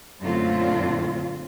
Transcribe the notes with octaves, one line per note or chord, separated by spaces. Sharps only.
F#2 A#2 D3 A3 C4 F4